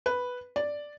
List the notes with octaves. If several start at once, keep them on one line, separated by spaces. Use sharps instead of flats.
B4
D5